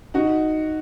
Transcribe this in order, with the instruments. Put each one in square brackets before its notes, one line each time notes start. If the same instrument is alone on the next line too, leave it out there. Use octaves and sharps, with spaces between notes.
[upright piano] D#4 F#4